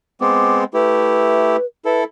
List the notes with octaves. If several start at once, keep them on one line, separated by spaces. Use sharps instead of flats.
G#3 B3 C4 D6
A3 E4 G4 B4
E4 A4 B4